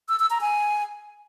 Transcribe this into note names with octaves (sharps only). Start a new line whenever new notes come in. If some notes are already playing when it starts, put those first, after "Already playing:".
E6
E6
A#5
G#5